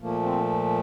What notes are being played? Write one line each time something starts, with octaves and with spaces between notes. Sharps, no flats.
A#2 F3 A3 A#3
C4